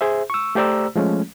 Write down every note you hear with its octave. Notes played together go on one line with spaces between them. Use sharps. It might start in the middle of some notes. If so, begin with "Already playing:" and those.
G#4 C5 E5
C#6 E6
A3 G4 C5 D5 A#5 E6
F3 G#3 A3 C#4